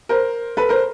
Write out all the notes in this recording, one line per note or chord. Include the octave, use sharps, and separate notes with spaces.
A#4 C5
A4 B4
A#4 C5